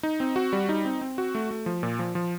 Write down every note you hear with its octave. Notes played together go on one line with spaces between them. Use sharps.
D#4
C4
F#4
G3
D#4
C4
C4
F#4
A3
A3
F3
A#2
F3
F3